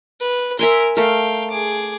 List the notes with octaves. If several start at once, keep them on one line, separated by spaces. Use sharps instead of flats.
B4
A#4 E5 G#5 C6
A3 A#4 F5 G5
G#4 D6